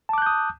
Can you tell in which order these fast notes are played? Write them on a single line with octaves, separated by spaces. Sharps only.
A5 D6 F#6 G6 D#6